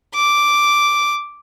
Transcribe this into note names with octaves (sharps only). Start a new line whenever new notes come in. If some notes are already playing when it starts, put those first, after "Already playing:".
D6